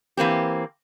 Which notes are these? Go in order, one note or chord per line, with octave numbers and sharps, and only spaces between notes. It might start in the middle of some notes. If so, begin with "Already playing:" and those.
E3 A#3 C4 G4